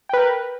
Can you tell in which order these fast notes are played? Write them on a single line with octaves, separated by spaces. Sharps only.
G5 B4 A#4